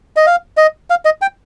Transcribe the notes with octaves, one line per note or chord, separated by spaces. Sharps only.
D#5
F5
D#5
F5
D#5
G5